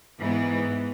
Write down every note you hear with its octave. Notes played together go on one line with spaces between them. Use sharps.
G#2 E3 B3